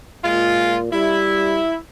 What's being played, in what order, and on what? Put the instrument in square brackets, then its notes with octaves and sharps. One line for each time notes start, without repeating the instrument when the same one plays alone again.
[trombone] A#2 [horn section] G#3 F4
[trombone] G3 [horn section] E4